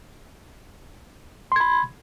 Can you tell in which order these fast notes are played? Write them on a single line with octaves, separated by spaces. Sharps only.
C6 G#6 B5